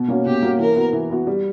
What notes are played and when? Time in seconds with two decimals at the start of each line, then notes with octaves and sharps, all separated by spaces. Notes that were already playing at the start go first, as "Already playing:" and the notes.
Already playing: B2
0.08 A#3 C#4 F#4
0.26 B2 G4
0.43 A#3 C#4 F#4
0.59 E3 A#4
0.76 B3 F#4
0.93 E3
1.10 B3 F#4
1.27 G3